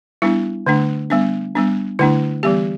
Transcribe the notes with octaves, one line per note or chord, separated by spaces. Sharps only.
G3 B3 D4 E4
D3 A3 D4
G3 B3 D4
G3 B3 D4
D3 A3 D4 E4
E3 G3 B3 G4